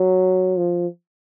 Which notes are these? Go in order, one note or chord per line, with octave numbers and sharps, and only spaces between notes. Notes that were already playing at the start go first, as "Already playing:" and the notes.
Already playing: F#3
F3